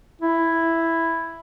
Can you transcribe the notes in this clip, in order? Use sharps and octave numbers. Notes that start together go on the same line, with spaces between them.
E4